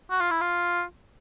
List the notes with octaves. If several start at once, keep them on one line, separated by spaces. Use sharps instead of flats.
F#4
F4
E4
F4